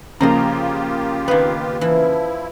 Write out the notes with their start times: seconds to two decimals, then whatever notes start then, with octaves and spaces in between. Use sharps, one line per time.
0.21 C#3 F3 A#3 F4 G4 D#5 A#5 C6
1.28 D#3 B3 B4 F5
1.81 E3 F3 E4